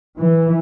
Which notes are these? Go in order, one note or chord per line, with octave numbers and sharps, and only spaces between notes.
E3